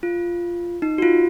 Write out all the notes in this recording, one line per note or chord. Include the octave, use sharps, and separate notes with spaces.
F4
D#4
F#4
F4